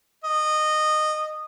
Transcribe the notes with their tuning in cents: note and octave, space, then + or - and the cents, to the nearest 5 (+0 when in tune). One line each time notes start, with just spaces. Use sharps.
D#5 -15